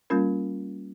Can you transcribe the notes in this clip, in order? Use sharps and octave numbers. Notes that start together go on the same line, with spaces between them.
G3 A#3 C#4 F4 A#4